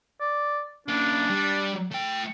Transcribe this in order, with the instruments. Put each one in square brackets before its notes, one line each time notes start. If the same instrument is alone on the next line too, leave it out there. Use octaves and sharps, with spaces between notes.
[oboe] D5
[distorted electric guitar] A#3 C#4 [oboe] D4
[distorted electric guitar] G3
A3 G5